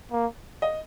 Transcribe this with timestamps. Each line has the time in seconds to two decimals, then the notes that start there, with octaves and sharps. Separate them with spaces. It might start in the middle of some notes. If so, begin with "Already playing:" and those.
0.11 A#3
0.62 D#5